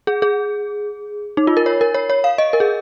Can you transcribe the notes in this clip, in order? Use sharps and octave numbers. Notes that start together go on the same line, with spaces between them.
G#4
G#4
D#4
F4
A#4
C#5
A#4
C#5
C#5
F5
D#5
A#4
G#4